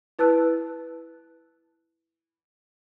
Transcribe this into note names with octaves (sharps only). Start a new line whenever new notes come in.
E4 B4 A5 E6 F#6